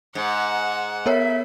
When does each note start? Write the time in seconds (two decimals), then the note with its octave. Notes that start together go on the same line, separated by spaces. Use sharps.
0.15 G#2 F#5
1.06 B3 A#4 C#5 E5